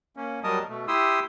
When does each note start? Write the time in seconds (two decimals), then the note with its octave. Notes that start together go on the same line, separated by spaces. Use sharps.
0.17 A#3 C#4
0.44 F#3 G3 A#4 D#5 A5 D#6
0.69 B2 A3
0.88 E4 G4 C6 D#6 E6